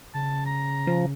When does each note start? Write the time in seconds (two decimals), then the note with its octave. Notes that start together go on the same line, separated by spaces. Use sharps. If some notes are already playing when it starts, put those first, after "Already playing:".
0.14 C#3 A5
0.46 A#5
0.87 F3